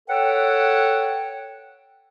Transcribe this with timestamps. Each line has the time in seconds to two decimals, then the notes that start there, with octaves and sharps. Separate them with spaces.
0.09 A4 B4 C#5 F#5 G5